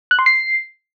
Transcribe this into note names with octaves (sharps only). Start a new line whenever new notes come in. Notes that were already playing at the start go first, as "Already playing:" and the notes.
F#6
C6
C7